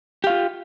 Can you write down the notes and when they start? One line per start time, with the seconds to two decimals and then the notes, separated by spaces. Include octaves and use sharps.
0.24 G4
0.27 F5
0.30 F4